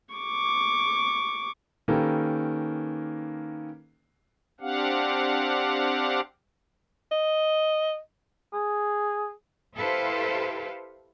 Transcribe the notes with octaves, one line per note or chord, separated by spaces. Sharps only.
C#6 D6
D#3 A#3 C#4 G4 A4 B4
C4 D4 G4 F5 F#5
D#5
G#4
E4 G4 A4 B4 C5 F5